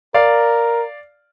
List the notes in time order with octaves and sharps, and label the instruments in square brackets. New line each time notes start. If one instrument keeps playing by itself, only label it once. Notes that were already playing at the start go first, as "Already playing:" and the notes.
[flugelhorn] A#4 [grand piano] D5 F5